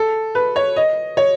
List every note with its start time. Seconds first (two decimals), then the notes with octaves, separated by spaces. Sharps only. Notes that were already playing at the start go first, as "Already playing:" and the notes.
Already playing: A4
0.35 B4
0.56 C#5
0.76 D#5
1.17 C#5